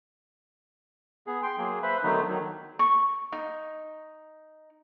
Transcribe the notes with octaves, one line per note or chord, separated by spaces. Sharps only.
B3 G#4
G5 C6
F#3 A#3 G#4
B4 C5 E5 B5
D3 D#3 F#3 A3 B3 D#4
D#3 F#3
C#6
D#4